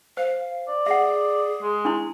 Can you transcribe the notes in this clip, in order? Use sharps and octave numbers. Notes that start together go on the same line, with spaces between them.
C5 F5
D5
G#4 E5 F#5
G#3
D4 E4 C6